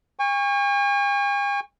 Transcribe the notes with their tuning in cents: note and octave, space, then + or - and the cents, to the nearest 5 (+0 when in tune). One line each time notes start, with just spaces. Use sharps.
G#5 -45 C#6 +0